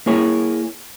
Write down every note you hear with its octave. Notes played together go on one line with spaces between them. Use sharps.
A#3 E4 G#4 C#5